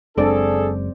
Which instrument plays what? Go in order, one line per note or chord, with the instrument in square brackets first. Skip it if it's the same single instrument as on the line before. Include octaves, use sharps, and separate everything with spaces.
[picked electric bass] F#1 F#2 G#3 [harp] C4 D5 [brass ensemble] D4 G#4 A4